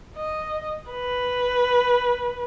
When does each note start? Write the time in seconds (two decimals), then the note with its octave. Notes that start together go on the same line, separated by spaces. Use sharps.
0.16 D#5
0.91 B4